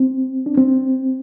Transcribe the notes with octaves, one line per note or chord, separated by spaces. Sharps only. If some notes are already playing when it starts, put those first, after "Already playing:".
Already playing: C4
D4
C4